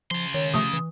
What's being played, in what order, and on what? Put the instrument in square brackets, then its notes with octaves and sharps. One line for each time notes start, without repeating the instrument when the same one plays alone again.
[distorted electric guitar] C#3 C6 [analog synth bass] F3
[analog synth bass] D#3 [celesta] C#5
[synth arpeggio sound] C3 F3 A3 [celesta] D#6
[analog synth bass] E3